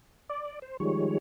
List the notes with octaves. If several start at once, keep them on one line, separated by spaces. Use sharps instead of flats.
D5
C5
D#3 F3 G3 G#3 C#5